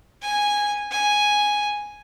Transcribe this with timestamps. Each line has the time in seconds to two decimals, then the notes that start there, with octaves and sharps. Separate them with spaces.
0.22 G#5
0.91 G#5